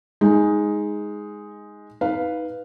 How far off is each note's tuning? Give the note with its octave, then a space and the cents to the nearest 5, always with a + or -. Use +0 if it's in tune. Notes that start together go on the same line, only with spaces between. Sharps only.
G#3 +0 D#4 +10
D#4 +25 B4 +0 F5 +0